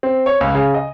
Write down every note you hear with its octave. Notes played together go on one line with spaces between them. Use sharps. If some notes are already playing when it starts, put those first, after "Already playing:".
C4
C#5
C#2
C#3
D#5